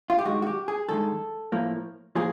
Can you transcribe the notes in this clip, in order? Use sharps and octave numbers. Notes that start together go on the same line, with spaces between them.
F4
G4
G2 D#3 G#3 F#4
F#4
G4
G#4
G2 D#3 G#3 A4
A2 F3 A#3
A2 F3 A#3 G#4